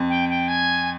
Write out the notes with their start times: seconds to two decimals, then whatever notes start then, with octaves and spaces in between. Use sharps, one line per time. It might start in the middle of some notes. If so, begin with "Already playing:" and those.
Already playing: F2
0.10 G5
0.29 G5
0.48 G#5